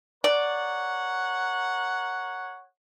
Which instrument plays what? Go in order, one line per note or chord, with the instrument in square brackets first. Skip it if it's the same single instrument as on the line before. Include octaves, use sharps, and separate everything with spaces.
[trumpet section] A#4 C#5 F#5 [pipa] D5